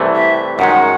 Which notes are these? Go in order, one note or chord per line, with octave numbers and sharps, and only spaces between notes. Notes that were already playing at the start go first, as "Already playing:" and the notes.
Already playing: C2 C3 E3 A3
E5
F#2 D#3 G#3 F#5